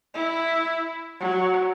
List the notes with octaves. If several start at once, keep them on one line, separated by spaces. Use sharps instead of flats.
E4
F#3